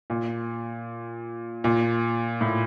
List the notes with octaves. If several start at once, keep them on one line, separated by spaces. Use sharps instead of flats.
A#2
A#2
A2